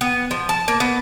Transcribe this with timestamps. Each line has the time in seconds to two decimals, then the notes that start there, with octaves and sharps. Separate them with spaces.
0.01 B3
0.31 F3
0.49 A5
0.68 A#3
0.80 B3